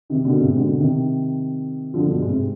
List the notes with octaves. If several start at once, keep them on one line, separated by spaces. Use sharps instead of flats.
C3 D#3
B2 D3
G#2 C3
B2 D3
C3 D#3
D3 F3
G2 B2
G#2
G#2 C3